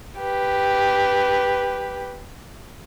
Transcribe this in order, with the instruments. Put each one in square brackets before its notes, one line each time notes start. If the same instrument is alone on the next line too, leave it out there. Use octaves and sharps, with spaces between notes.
[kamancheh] G4 B4